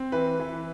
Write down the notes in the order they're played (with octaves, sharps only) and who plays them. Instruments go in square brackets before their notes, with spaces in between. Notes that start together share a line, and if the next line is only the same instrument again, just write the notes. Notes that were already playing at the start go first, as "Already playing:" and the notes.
Already playing: [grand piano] C4
E3 B4
E3